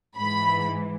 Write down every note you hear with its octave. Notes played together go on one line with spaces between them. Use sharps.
G#2 E3 B5